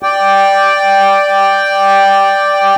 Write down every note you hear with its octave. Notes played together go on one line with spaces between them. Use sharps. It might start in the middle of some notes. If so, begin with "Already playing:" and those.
D5 G5